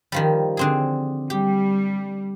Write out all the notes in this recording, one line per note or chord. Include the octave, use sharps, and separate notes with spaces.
D#3 F3 G3
D3 C4 G#4
G3 G4